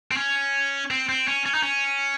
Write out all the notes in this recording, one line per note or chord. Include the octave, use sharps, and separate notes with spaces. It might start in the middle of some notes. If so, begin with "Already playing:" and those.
C4
C#4
C4
C4
C#4
C#4
D#4
C#4